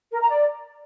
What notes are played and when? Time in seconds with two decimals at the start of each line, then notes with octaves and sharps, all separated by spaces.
0.11 A#4
0.20 A#5
0.29 D5